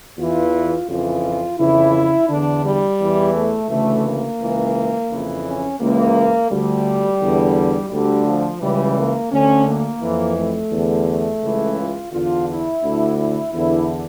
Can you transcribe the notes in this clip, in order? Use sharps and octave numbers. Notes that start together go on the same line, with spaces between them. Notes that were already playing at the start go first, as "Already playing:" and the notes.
E2 E3 F4
F2 C#3 E3 F4
F2 C#3 E3 E4
E2 D3 D4
G3
E2 E3
A3
D2 C#3 E3 A3
A#3
C#2 C#3 E3
F2 C#3 E3
C#4
C#2 C#3 E3 A#3
D2 D3 G3
E2 D3
D2 D3 G3
F3
C#2 C#3 E3 G3
A#3
D2 D3 C#4
A#3
F2 E3
A3
E2 D3
A3
C#2 C#3 E3
F4
E2 D3 F4
E4
D2 D3
E4
E2 D3 E4